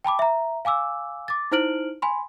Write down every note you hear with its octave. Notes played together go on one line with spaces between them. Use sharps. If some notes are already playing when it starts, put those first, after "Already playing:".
G5 A5 B5 D6
E5 A#5
F5 G#5 D6 E6
D6 A6
D#4 E4 C5 F6 D7 F#7
G#5 B5 C6